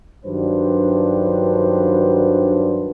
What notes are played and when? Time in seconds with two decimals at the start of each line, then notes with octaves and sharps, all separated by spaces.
0.26 G2 D#3 F#3 D4 B4 C5